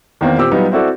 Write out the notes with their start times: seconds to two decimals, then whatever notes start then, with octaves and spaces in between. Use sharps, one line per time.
0.21 E2 D#3 A#3 C4
0.38 A#2 C4 G4 D6 E6
0.51 F#3 G3 B3 D#4 F4
0.72 C4 E4 F#4 A4 D5